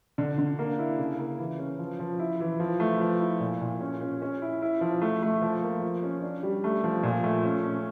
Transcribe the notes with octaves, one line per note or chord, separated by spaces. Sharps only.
D3
D3
A#3
E4
C#3
A#3
E3
C#4
F3
F3
E4
E3
F3
A3
F3
E4
A#2
A#2
C#4
C#4
C#4
E4
E4
F3
A3
A3
F3
A#3
F3
C#4
D4
G3
A3
F3
A#2
A3
C#4
C#4